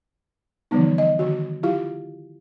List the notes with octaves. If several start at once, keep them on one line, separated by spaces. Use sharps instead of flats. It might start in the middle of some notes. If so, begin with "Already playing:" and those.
D3 E3 F3 G3 B3 D#4
D#5
D3 D#3 F#4
F#3 E4 F4 G4 F5